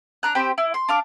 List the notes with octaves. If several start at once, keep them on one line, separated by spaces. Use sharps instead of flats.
D4 A#5 F#6
C4 G4 C5 B5
E4
C6
D4 F5 D6